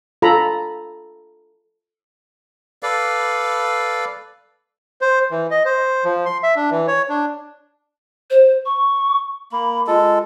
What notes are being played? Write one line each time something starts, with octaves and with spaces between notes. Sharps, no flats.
F4 A4 A#5 B5
A4 B4 D5 F5
C5
E3
D#5
C5
F3
C6
E5
D4
E3
C#5
D4
C5
C#6
A#3 B5
G#3 F4 A4